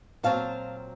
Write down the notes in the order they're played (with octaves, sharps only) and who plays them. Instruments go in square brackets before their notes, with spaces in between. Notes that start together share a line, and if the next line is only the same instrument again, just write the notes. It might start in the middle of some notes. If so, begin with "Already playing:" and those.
[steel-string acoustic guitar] A#2 F#3 C4 F5 A5